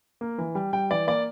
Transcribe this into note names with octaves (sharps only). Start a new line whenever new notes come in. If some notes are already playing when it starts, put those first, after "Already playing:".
A#3
E3
G3
G3 G5
E3 D5
A#3 D5